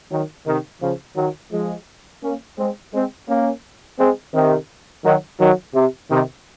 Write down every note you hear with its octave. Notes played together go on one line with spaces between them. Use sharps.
D#3 F#3
C3 D#3
C#3 F3
D#3 F#3
F3 G#3
A#3 C#4
G#3 C4
G#3 C4
A#3 C#4
G#3 C4
C3 D#3
D#3 F#3
D#3 F#3
C3
C3 D#3